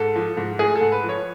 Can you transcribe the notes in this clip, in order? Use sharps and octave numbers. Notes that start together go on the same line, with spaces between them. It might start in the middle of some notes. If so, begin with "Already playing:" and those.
Already playing: G#2 A4
F3
G#2
A3 G#4
A4
G#2
B4
F3
C#5